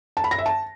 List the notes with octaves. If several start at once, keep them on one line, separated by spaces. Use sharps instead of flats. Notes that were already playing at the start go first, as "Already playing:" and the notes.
A5
B5
A#6
E5
A5